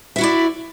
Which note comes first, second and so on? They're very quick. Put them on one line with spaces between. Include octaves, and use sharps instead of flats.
E5 F#4 E4 D5